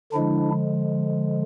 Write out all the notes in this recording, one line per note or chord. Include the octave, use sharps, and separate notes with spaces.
D3 F3 G#3 D4 E4